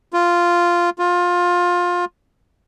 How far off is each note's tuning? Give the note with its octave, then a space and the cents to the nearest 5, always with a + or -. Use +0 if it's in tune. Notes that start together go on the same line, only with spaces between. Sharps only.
F4 -5
F4 +20